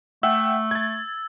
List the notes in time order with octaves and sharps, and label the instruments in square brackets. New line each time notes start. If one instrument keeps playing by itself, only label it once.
[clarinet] A3 [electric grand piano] E5 F#5 G5 [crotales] E6
[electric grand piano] G#6 A6